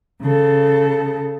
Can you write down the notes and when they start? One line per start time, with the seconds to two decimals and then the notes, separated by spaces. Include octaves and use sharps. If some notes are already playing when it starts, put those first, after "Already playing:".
0.20 C#3 A4